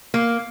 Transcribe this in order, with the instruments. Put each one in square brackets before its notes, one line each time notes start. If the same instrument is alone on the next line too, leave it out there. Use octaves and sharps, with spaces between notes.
[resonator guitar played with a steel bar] A#3